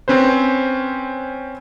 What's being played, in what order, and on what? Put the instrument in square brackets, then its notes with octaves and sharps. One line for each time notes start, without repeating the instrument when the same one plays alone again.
[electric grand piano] C4 C#4 B4 C5